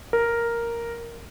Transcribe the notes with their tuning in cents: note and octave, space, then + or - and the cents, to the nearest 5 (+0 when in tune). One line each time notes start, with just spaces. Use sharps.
A#4 +0